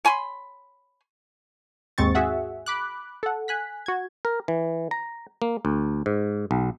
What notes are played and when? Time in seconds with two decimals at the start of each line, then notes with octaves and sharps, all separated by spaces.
0.05 C#5 G#5 B5 C6
1.98 D#2 G#2 C4 C#6 A6
2.15 F#4 G#4 E5 F#5
2.66 B5 D6 F#6
3.23 A4 F#5
3.48 G#5 F#6 B6
3.86 F#4 G#6
4.25 A#4
4.48 E3
4.91 A#5
5.42 A#3
5.65 D2
6.06 G#2
6.51 B1